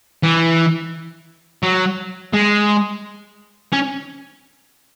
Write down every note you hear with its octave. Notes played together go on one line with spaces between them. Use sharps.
E3
F#3
G#3
C#4